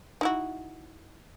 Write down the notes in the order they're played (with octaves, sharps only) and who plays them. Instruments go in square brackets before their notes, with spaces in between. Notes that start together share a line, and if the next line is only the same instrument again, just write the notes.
[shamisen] D#4 E4 F#4